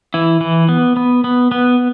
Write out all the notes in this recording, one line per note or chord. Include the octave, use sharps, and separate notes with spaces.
E3 E4
E3
B3
B3
B3
B3